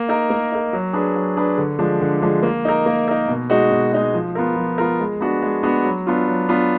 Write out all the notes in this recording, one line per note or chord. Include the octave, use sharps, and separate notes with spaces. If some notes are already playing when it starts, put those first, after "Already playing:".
Already playing: A#3
D#4 A#4
A#3
D#4 A#4
F#3
D4 G#4 B4
F#3
D4 G#4 B4
D3
F3 G#3 D4
D3
F3 G#3 D4
A#3
D#4 A#4
A#3
D#4 A#4
B2
G#3 D#4 F#4
B2
G#3 D#4 F#4
F3
B3 F4 A#4
F3
B3 F4 A#4
G#3
B3 D4 F#4
G#3
B3 D4 F#4
F#3
B3 D4 F4
F#3
B3 D4 F4